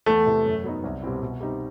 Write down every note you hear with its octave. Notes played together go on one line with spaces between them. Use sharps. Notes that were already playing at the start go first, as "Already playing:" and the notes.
E2 A3
C3 E3
F#2
F#3 B3 D#4
C2
B2 G3 C4 E4
B2
G3 C4 D#4